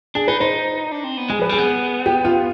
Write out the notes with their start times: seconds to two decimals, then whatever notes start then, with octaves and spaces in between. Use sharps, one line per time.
0.15 D4 G#4
0.28 D#4 B4
0.40 D#4 C5
0.92 D4
1.04 C4
1.17 B3
1.30 G#3 G#4
1.39 F3 B4
1.49 G3 G#4
1.58 B3
2.06 G4
2.25 F4